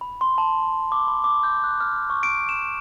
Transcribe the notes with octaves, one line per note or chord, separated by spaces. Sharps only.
B5
C6
A5
D6
B5
D6
G6
F#6
F6
C#6
D7
E7